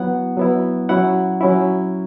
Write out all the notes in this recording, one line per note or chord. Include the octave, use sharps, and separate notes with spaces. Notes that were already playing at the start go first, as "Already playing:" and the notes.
Already playing: F#3 B3 E4 F#5
F#3 B3 E4
F#3 C#4 E4 F#5
F#3 C#4 E4